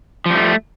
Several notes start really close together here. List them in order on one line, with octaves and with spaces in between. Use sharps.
F3 G3 A3